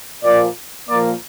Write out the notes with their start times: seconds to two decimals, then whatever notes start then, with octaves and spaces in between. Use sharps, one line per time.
0.24 A#2 F3 A#3 D5
0.88 A#2 F3 A#3 D5